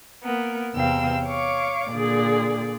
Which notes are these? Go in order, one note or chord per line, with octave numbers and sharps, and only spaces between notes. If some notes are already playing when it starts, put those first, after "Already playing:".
A#3 B3 A#4
E2 C3 F5 G5 E6
C#5 F5 C#6 D6
A#2 D3 G#4 D5